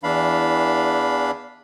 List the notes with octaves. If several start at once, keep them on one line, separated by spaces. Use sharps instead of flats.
E2 E3 D4 F5 B5